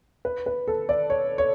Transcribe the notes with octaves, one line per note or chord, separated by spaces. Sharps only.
B4
B4
A4
D5
C#5
C#5